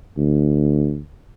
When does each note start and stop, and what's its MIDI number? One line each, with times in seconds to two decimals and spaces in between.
0.17 1.00 38